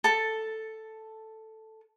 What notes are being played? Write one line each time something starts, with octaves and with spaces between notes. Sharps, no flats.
A4 A5